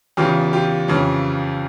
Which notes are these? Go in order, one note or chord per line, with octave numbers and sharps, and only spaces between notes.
E2 C#3 E3 F4 G4
F4 G4
F2 C#3 E3